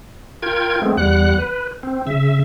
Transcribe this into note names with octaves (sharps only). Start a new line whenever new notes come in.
F4 A#4 G5 G#6
G#3 A3 B3 C4
E2 G3 F#5 F#6
B4
C4
C#3 E5